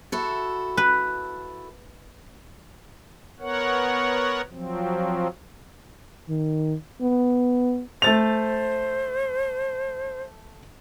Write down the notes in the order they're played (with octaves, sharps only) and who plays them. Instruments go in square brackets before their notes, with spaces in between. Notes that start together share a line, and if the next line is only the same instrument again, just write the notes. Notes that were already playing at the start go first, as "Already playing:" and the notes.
[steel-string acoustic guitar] E4 F#4 A4
[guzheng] B4
[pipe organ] B3 A#4 C#5 F#5
F3 F#3 C4
[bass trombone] D#3
B3
[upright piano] A3 A6 F7 [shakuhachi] C5